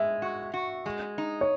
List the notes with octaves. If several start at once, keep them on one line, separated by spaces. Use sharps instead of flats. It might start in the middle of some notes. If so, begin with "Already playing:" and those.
Already playing: G#3 E5
F#4
F#4
G#3
D#4
C#5